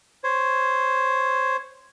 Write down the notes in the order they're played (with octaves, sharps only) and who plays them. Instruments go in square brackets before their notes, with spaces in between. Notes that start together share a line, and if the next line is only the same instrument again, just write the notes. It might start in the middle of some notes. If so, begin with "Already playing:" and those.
[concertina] C5 C#5